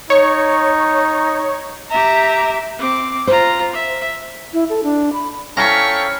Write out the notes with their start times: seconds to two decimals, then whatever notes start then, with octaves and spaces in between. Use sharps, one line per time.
0.10 D#4 C#5 C#6
1.91 G4 E5 A#5
2.79 C4 D6
3.27 F4 C5 A#5
3.73 E5
4.53 E4
4.70 A4
4.83 D4
5.13 B5
5.57 C#4 E4 A4 F5 G5 A#5 C#6 B6